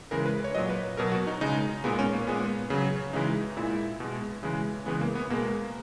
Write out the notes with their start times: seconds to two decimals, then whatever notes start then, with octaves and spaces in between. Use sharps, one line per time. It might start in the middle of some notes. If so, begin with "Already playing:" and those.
0.11 C#3 E3 G#3 A#4
0.26 B4
0.44 C#5
0.55 A#2 F#3 D#5
0.69 B4
0.97 B2 F#3 A#4
1.12 F#4
1.27 D#4
1.41 C#3 G#3 D#4
1.84 A#2 G#3 B3
1.99 C#4
2.13 A#3
2.27 A#2 G#3 B3
2.70 C#3 F#3
3.13 C#3 E3 G#3 D#4
3.57 A#2 G#3 E4
4.00 B2 G#3
4.43 C#3 E3 G#3
4.86 C#3 E3 G#3 B3
5.01 A#3
5.15 B3
5.30 B2 G#3 A#3